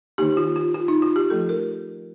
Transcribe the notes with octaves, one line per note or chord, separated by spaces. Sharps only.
D#3 A#3 D#4 G4
F4
F4
F4
D#4
F4
G4
F3 A3 D#4 A4
A#4